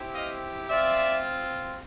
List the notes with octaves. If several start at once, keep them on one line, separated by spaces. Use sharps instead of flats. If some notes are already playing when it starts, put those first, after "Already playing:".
Already playing: C4 E4 G4
D#5 F5
C4 F4 D5 E5